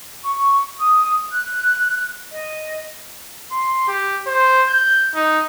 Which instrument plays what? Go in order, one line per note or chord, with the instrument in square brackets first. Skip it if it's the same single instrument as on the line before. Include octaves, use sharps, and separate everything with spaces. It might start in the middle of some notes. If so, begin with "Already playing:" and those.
[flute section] C#6
D#6
F#6
D#5
[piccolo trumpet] C6
G4
C5
G6
D#4